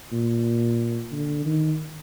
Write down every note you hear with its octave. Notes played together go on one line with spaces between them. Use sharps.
A#2
D3
D#3